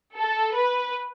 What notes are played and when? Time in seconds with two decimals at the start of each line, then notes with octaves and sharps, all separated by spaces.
0.16 A4
0.54 B4